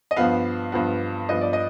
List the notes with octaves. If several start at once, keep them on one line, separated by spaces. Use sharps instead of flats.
D#5
G2 F3 B3 F5
G2 F3 B3
G2 F3 B3 D#5
D5
D#5